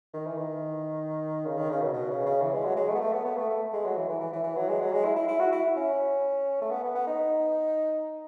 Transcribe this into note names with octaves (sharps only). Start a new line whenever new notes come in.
D#3
E3
D#3
C#3
D#3
C#3
B2
B2
C#3
C#3
E3
G#3
F#3
G#3
A3
B3
A3
B3
B3
A3
A3
G#3
F#3
E3
E3
E3
E3
E3
F#3
G#3
F#3
G#3
E4
E4
E4
F#4
E4
C#4
A3
B3
B3
B3
D#4